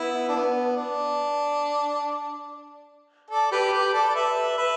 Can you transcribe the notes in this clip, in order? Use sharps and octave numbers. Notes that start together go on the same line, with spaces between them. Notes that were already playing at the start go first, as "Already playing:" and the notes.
Already playing: B3 E4
D4
B3
D4
A4 D5
G4 B4
G4 B4
A4 D5
D5
B4 E5
B4 E5